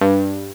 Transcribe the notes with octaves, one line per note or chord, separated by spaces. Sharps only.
G2